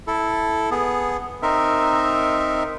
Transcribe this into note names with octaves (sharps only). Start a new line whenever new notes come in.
E4 A4
B3 G#4
C4 D#4 A#4 E5